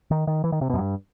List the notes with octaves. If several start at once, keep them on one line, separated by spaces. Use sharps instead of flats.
D#3
D#3
E3
D#3
C3
B2
F#2
G2